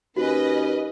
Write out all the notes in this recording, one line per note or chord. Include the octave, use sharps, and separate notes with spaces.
D#2 C#4 F#4 B4 D#5